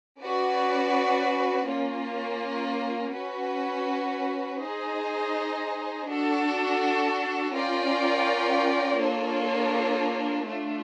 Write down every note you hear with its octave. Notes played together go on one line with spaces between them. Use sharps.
C#4 F#4 B4 D5
A#3 C#4 F4
C#4 F#4 B4
D#4 G#4 C5 D#5
D4 F#4 A4
C#4 F4 A#4 D5 G5
A#3 D4 F4 A4 C#5
A3 D4 F4